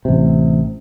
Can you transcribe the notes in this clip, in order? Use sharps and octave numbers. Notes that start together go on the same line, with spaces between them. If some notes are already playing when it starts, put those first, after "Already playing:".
A1 C3